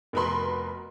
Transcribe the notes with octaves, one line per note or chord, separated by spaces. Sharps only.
F1 B2 A#4 B4 B5 C6